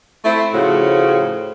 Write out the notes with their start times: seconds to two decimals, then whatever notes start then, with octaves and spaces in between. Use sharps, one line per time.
0.24 A3 C4 E4
0.53 A2 C#3 F3 F#4